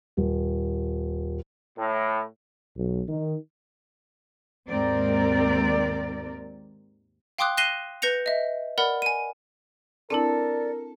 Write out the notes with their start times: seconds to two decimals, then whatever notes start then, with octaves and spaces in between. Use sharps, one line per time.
0.17 D#1
1.78 A2
2.77 B1
3.09 D#3
4.69 D#2 G#2 D#3 C4 A#4 D5
7.38 F5 G5 C6 D6 D#6 F#6
7.57 F#6 A#6 C7 D#7 E7 G7
8.02 B4 G6 A#6 C#7 F7
8.26 D#5 E5
8.78 A#4 D5 F#5 B5
9.02 G#5 D#7
10.10 C4 D4 E4 A4 A#4 D5